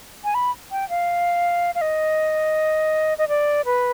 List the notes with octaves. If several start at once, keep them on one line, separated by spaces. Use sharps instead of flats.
G#5
B5
G5
F5
F5
D#5
D#5
D5
B4